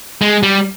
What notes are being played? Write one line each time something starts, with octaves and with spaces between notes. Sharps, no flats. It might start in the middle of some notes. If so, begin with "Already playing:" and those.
G#3
G3